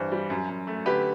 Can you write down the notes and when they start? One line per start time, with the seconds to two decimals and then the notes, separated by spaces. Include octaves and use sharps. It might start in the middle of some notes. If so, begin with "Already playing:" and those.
Already playing: G2 E3 C5
0.12 G3
0.30 F#2
0.49 F#2
0.67 A3
0.86 D3 G4 B4